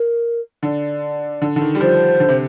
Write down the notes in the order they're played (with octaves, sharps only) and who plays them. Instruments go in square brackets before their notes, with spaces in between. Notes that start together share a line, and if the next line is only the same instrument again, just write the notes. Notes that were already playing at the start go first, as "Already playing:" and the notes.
Already playing: [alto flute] A#4
[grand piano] D3 [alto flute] D5
[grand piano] D3
D3
D#3
G3
[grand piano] F3 [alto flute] C5
[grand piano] D3
C3